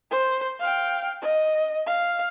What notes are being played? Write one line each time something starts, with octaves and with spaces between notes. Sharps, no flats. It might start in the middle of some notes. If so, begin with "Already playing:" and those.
C5
F5 G5
D#5
F5